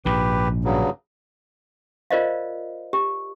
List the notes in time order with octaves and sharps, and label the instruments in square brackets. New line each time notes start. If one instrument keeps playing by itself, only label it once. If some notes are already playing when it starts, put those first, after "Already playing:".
[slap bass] A#1 G#2 [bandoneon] G4 B4
[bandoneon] G2 C#3 F#3
[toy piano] F4 A#4 C5 D5 D#5 F5
G4